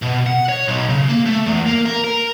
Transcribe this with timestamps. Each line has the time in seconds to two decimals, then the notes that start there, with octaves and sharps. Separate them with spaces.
0.02 B2
0.26 F#5
0.49 C#5
0.68 B1
0.90 C#3
1.09 A#3
1.26 A3
1.46 E2
1.66 A#3
1.86 A#4
2.04 A#4